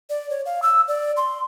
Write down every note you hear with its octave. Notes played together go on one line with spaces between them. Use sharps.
D5
C#5
F5
E6
D5
C6